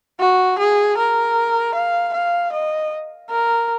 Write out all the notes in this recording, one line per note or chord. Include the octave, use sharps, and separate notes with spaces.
F#4
G#4
A#4
F5
F5
D#5
A#4